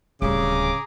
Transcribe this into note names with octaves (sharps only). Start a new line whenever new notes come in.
D1 C#3 G3 G#4 A#5 D6